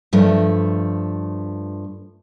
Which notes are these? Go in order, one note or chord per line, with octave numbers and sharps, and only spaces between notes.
G2 F3 A3